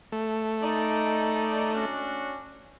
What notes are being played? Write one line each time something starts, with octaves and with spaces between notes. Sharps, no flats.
A3
D#4 D5
C#4 D4 F#4